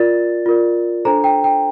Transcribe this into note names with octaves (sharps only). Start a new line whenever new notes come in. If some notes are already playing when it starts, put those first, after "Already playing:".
Already playing: F4 A#4 D5 A6
F4 A#4 D5
D4 A4 C5 A#5
G5
G5